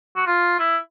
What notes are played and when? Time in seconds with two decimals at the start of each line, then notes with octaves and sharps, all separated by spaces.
0.16 F#4
0.27 F4
0.59 E4